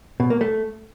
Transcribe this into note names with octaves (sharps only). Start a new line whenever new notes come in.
B2
A#3
A3